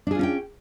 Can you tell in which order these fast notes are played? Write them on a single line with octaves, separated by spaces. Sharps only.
D4 G#4 F4 C#4 G5